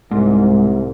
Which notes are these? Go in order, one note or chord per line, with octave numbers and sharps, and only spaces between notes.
C2 G#2